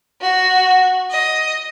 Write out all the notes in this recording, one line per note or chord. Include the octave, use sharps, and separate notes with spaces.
F#4
D#5